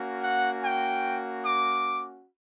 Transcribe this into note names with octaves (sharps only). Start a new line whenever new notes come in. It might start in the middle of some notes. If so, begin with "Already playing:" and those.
Already playing: A#3 C#4 F#4
F#5
G5
D6